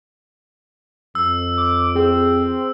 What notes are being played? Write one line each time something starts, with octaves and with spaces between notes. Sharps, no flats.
F2 E6
D6
C4 G#4